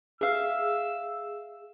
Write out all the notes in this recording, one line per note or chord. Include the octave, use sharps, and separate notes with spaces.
G#4 E5 F5 E6